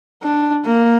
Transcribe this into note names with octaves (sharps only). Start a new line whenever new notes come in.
D4
A#3